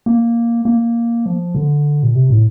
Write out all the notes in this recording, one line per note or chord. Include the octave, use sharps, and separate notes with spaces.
A#3
A#3
F3
D3
A#2
C3
A2